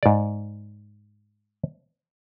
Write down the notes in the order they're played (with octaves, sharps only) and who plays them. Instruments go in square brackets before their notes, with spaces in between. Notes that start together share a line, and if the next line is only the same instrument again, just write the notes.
[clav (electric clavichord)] G#2 D5